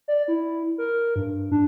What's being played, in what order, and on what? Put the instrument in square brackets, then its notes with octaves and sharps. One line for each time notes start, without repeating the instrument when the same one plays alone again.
[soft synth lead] D5
E4
A#4
G2
D4